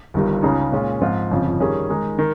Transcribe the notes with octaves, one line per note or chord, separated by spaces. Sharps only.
G1 G2 D#3 G3
C#2 C#3 G#3 D#4
A#2 G#3 C#4 F4
G#2 F3 C4 F4
G1 F2 C#3 F3
D#3 G3 C#4 G#4
D#3 G#3 D#4
D#3